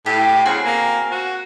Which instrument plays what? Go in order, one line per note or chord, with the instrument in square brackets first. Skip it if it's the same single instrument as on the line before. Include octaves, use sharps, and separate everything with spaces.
[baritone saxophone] A2 [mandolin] G4
[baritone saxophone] C#3 [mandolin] C4 F#4 G#4
[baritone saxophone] A#3
F#4